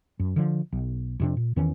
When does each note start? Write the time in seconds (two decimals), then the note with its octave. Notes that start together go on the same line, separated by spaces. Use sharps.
0.19 F#2
0.36 D3 F3
0.72 B1
1.20 F2 C3 D4
1.37 A#2
1.56 E2 D#3 E3 C#4